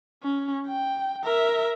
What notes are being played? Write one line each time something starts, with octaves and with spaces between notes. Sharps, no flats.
C#4
G5
A#4 E5